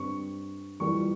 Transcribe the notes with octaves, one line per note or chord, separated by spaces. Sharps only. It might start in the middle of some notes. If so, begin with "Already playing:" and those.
Already playing: G2 G3 C4 C#6
F2 E3 G3 A#3 C#6